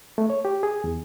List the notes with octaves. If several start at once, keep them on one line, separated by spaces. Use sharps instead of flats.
A3
C#5
G4
G#4
E2